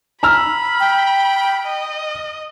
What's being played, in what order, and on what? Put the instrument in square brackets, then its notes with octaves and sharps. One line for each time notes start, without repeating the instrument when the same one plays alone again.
[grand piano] A#5 E6 F6 [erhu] B5
[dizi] G5
[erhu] D#5